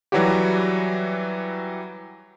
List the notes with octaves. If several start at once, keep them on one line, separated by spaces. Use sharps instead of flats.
E3 F#3 G3 F#4 G4